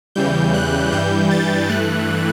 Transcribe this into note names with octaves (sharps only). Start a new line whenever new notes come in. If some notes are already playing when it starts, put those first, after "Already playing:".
E2 C#3 E3 G3 G6
F#6
G2 E3 G3 G6
A6
G2 E3 A3 F#6